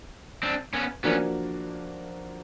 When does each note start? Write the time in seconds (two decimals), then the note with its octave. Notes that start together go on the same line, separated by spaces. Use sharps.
0.43 C4 D4
0.73 B3 C#4
1.04 F3 A#3 B3 C#4 D4 F#4